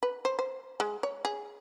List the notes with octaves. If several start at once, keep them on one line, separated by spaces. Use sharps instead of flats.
B4
C5
C5
G#3
C#5
G#4